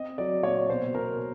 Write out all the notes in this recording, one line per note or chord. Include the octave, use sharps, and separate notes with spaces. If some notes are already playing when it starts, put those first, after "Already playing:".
Already playing: C4 D#5
F#3 D5
A#2 C#5
B2 C5
B2 A#4